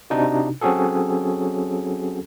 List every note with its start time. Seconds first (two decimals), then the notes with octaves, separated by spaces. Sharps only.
0.10 C3 D4 D#4 F#4
0.61 F#3 C4 C#4 F#4 G#4 A4